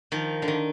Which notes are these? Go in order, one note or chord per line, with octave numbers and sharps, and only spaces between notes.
D#3 F3
D3
D#3